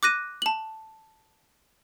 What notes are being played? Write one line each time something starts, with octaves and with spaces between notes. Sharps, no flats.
D6 F#6 A#6 D#7
A5 F#7